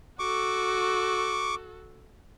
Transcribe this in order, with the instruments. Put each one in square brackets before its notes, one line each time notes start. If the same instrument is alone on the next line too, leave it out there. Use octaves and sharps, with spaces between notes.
[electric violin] F#4 A4 [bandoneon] C#6 D6